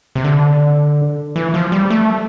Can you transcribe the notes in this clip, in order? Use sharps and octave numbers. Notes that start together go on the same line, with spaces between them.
C3
D3
E3
F3
G3
A3